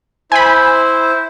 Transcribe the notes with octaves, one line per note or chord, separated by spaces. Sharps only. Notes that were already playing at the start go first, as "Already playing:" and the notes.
E4 C5 G#5 B5